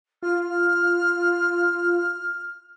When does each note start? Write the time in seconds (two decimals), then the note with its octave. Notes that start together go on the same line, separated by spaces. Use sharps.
0.23 F4 F6